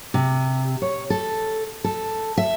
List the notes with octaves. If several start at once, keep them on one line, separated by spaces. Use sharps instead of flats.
C3
C#5
A4
A4
E5